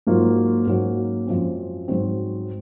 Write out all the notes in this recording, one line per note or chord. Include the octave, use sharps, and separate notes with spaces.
G#2 F#3 A#3 F4
G#2 F#3 A#3 C#4 F#4
F#2 F3 C4
G#2 F#3 C4